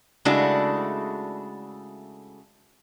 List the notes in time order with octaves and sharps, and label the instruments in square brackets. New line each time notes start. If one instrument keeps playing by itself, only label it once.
[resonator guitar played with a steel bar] C#3 G#3 A3 D4 E4 F#4